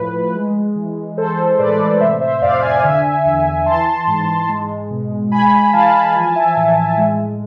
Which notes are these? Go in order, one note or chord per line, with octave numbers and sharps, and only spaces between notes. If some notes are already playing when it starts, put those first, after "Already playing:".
Already playing: A2 F3 B4
G#3
E3
G#3 A4 C5
C5
A2 B4 D5
C3 C5 E5
C5 E5
F2 D5 F5
G#5
F5
D3 E5 G#5
E2
E3 A5 C6
G#2
G#3
B2
G#3 G#5 B5
E3 F5 A5
F3 G#5
A5
E5 G#5
A2
G#3